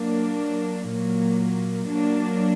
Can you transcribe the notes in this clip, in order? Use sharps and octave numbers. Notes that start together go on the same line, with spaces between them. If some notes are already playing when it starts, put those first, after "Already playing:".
Already playing: F#3 A#3 D4
A#2 F#3 A#3
F#3 A#3 D4